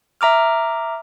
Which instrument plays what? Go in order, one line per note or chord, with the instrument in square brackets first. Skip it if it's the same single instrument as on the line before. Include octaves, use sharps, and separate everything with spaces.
[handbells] E5 A#5 D6 F6